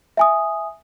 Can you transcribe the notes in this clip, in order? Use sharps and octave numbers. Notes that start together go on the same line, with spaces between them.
E5 G#5 D#6